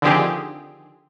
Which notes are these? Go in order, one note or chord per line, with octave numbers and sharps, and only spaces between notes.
D3 D#3 F3 C4 G4 G#4